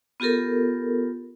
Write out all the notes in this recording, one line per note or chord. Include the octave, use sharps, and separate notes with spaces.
B3 F4 G4 A4 A#4